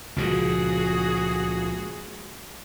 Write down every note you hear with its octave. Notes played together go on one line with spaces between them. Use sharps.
C#2 A#2 F3 F#4 G#4